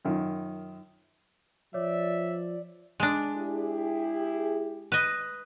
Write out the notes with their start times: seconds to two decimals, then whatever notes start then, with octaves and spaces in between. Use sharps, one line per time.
0.05 F#2 D#3 F4
1.74 F3 C#5 D5 E5
3.00 G#3 D4
3.36 E4 G4 G#4
4.92 B4 D#5